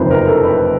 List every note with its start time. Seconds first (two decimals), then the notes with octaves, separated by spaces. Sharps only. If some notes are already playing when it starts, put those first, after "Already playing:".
Already playing: F#1 F2 C3 D#3 B4 C5
0.11 A#4
0.27 A4
0.44 B4